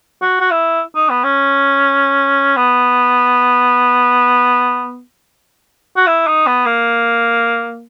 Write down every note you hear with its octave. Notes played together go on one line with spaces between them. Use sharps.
F#4
F#4
E4
D#4
B3
C#4
B3
F#4
E4
D#4
B3
A#3